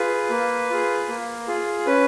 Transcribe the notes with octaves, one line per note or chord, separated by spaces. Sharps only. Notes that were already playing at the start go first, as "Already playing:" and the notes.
Already playing: F4 G#4 B4
A#3
F4 G#4
A#3
F4 G#4
C#4 B4